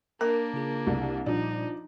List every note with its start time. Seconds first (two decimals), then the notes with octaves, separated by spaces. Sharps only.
0.21 A#3 D4 A#4 A#5
0.54 C#3 F4 G#4
0.87 C2
1.26 A#2 F3 G3 D4 D#4